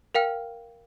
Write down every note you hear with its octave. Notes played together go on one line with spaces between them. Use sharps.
A#4 F5 G5 F6